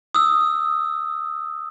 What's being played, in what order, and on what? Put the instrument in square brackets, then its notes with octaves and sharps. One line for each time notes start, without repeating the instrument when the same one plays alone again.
[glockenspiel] D#6 E6